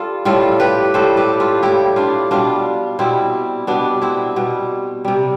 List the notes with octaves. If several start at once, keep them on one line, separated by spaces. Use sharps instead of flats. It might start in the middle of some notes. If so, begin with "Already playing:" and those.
Already playing: G3 F4 A4
A2 G3 F4 A4
G4 B4
A2 G3 A4 C5
G4 B4
F4 A4
A2 G3 E4 G4
D4 F4
B2 G3 D4 F4
B2 G3 C4 E4
B2 G3 B3 D4
C4 E4
B2 G3
C3 G3